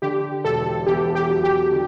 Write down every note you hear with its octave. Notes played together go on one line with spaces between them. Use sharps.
D3 G4
E1 A4
E2 G4
G4
F#3
G4
D3